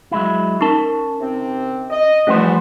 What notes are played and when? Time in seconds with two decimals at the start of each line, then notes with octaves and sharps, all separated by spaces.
0.11 F#3 G#3 E4
0.61 C#4 D#4 A#4 A5
1.21 C3 C4
1.90 D#5
2.27 E2 E3 F3 G3 A3 C#4 F#4 C5